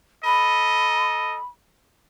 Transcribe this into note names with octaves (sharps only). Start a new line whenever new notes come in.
A4 D#5 B5